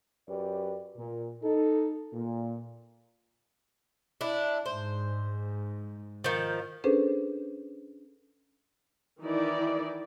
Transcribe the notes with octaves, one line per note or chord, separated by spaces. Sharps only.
F#2 G4 B4 D5
A#2
D#4 A4
A#2
D4 E4
G#2 C5
D#3 F3
C#4 D4 G#4 A4 B4 C5
D#3 E3 D#4 E4 D5